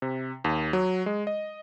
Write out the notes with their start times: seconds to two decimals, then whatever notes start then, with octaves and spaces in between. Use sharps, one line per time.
0.02 C3
0.44 D#2
0.73 F#3
1.06 G#3
1.27 D#5